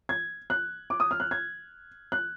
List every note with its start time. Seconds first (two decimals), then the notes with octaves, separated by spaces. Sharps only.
0.09 G#6
0.50 F#6
0.90 D6
1.00 D#6
1.11 F6
1.20 F#6
1.31 G#6
2.12 F#6